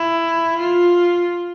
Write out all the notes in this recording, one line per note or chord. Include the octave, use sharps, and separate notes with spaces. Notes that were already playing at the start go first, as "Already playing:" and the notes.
Already playing: E4
F4